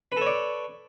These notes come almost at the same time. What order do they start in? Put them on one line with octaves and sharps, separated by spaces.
B4 A4 C#5 D5